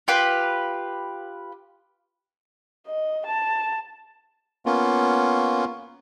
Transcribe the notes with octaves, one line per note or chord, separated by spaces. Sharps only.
F4 G4 B4
D#5
A5
A#3 B3 C#4 F4